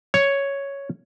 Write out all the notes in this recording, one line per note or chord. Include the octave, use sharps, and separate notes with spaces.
C#5